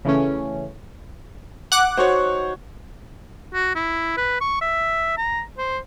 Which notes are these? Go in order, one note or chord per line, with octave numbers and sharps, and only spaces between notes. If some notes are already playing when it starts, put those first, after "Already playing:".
C#3 E3 A3 C#4
F#5 D6 F#6
D#4 F#4 C5 C#5 C#6
F#4
E4
B4
C#6
E5
A#5
C5